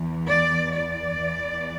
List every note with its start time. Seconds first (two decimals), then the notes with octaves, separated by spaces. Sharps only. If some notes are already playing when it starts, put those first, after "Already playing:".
Already playing: E2 E3
0.28 D5
0.73 D5
1.18 E2 E3